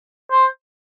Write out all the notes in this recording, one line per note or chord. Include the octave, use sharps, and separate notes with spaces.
C5